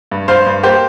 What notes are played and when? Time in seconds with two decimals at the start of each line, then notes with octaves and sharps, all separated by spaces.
0.11 G2
0.28 G2 C5 F5
0.46 G2
0.63 A#3 G4 C5